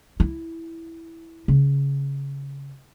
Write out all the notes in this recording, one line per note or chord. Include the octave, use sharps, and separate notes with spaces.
E4
C#3